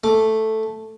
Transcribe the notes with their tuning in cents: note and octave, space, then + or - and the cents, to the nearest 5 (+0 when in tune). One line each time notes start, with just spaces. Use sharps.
A3 +0 D6 +0